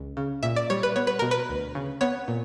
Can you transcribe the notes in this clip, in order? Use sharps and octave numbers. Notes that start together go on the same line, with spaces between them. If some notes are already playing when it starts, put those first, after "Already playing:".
Already playing: C#2
C#3
A#2 E5
D5
G3 C#5
B4
B3 C#5
B4
B2 A#4
B4
D2
C#3
B3 C#5
A#2